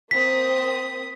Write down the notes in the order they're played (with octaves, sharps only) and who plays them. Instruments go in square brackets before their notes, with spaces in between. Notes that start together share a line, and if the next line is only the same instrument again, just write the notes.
[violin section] A#3 C4 D#6 [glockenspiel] B6